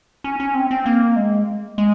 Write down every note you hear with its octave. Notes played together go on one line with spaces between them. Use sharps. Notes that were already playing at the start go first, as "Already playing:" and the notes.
C#4
C#4
C4
C4
A#3
G#3
G#3